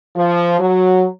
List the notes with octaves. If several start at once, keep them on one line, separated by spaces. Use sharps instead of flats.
F3
F#3